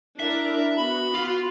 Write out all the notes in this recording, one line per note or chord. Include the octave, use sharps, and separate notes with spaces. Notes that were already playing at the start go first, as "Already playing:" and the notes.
D4 E4 A#4 E5
B3 F#4 B5
F4